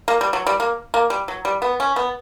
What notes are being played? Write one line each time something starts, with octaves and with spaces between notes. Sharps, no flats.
A#3
G3
F#3
G3
A#3
A#3
G3
F#3
G3
B3
C#4
B3